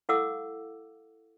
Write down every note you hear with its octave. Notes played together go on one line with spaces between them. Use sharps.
E4 A4 F5 F#5 D6 E6